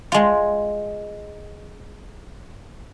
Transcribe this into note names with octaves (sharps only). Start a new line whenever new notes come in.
G#3 F4